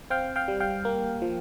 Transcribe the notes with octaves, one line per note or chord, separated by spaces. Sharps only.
C4 F5 G5
F5 G5
G3
F5 G5
A#3
F3